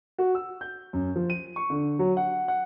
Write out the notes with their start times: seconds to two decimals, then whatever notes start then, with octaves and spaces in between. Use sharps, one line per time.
0.18 F#4
0.35 E6
0.61 G6
0.93 F#2
1.16 F3
1.30 D#7
1.56 C#6
1.70 D3
1.99 F#3
2.17 F#5
2.48 F#5